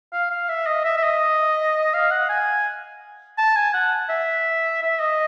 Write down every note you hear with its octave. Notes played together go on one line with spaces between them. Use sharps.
F5
F5
E5
D#5
E5
E5
D#5
F5
F#5
G#5
A5
G#5
F#5
E5
E5
D#5